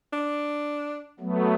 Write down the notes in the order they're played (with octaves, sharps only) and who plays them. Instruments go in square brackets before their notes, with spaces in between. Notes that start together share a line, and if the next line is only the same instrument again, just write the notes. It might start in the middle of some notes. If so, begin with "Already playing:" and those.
[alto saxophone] D4
[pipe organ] F#3 A3 B3